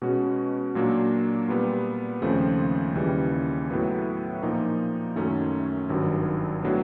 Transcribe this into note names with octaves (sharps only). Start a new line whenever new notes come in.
B2 G#3 C#4 F#4
A#2 F#3 A#3 D4
A#2 G3 B3
D#2 C#3 F3 A3 C4
D#2 C#3 E3 G3
A2 F#3 B3 E4
A#2 F3 A#3 D#4
F#2 D#3 F#3 A3 C#4
G#1 G2 D#3 F#3
A2 F#3 B3 D4